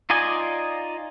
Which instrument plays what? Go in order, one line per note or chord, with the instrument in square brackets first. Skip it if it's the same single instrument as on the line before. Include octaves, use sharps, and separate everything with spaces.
[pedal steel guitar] D#4 F4 D5 D#5 G#5